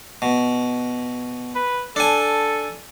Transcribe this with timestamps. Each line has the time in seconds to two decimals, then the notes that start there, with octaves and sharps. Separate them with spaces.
0.22 B2
1.55 B4
1.96 D4 A4 G#5